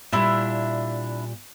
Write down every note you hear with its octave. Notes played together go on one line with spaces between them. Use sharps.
A#2 G3 D4 E4